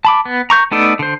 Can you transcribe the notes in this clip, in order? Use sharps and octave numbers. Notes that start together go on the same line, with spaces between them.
A5 B5 D6
B3
A#5 C#6 G6
A3 B3 D#4 A4 D5
D3 C5